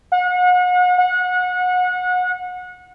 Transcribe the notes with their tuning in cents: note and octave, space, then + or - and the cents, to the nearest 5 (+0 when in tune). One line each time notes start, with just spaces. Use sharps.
F#5 -40
F#5 -30